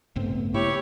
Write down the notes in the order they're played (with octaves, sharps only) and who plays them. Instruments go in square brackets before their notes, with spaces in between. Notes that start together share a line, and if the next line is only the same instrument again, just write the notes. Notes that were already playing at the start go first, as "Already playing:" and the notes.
[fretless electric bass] A1 G2 C4 [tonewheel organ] C#3 A3 B3
[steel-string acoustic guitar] E4 [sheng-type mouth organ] G4 C#5 C#6